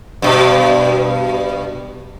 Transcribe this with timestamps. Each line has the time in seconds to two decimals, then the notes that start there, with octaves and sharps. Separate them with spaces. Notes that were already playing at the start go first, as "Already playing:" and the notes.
0.22 G2 B2